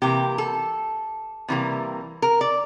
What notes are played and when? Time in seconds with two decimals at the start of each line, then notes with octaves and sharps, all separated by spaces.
0.02 C3 E3 A#3 G4
0.38 A4
1.48 C3 E3 G3 A#3
2.22 A#4
2.41 D5